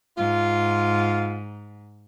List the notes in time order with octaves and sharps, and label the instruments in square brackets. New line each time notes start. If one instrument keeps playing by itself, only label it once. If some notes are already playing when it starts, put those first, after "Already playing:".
[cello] G#2 [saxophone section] F4